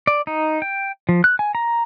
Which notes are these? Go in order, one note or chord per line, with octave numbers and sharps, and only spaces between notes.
D5
D#4
G5
F3
F#6
G#5
A#5